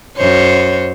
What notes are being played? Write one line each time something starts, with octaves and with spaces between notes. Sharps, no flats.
F#2 C5 C#5